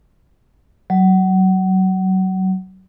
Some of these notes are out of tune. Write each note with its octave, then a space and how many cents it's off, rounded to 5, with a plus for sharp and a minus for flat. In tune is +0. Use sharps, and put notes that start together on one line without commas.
F#3 +25